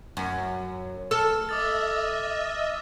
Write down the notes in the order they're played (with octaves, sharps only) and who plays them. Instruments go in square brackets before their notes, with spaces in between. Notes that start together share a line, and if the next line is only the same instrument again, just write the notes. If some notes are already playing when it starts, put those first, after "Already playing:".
[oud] F#2
[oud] A4 [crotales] E6 F6
[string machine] D#5 E5 [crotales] D6 D#6 A6